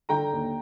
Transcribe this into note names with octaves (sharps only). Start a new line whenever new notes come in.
D3 G5 A#5
D#2